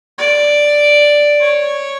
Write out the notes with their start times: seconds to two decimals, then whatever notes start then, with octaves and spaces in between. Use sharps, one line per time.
0.18 D5
1.41 C#5